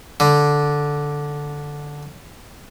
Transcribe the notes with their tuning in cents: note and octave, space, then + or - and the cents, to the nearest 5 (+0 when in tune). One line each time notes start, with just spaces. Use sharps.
D3 -5